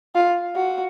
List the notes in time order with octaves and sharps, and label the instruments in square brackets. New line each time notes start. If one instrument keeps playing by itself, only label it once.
[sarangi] F4
F#4